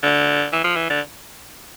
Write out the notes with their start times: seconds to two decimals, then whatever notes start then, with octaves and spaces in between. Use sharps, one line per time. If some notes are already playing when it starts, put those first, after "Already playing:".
0.03 D3
0.52 E3
0.64 F3
0.76 E3
0.90 D3